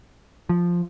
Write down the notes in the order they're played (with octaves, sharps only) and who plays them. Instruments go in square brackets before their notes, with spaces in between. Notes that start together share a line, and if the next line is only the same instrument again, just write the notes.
[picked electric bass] F3